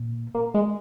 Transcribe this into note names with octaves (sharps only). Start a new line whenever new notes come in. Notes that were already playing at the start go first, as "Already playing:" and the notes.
Already playing: A#2
A#3
G#3